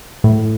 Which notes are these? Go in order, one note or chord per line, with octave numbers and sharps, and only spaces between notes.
A2